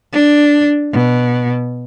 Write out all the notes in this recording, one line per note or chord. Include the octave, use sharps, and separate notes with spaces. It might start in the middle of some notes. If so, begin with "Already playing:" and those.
D4
B2